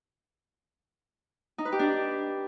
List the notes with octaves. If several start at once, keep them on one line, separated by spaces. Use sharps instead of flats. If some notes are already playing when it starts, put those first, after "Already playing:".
D#4
B4
G4
D4